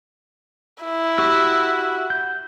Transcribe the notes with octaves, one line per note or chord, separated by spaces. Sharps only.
E4
F#4 G4 E6
G6